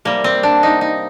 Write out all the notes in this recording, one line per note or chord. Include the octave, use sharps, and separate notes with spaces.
C3 G3 A#3
C4
D4
D#4
D#4